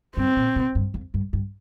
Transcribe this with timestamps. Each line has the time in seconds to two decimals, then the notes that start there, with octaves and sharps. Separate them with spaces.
0.17 G2 C4
0.36 A#2
0.56 C3
0.75 G2
0.94 F2
1.14 G2
1.33 G2